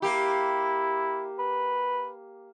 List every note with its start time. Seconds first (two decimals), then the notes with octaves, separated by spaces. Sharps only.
0.02 A#3 E4 G4
1.39 B4